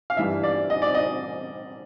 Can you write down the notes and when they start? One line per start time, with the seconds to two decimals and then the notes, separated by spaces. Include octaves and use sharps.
0.10 F5
0.17 G2 E3 G3 E5
0.43 D5
0.70 D#5
0.82 D5
0.95 D#5